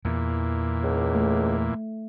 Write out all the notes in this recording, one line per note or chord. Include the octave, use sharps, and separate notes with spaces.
E2 A#2 E3
C#2
A3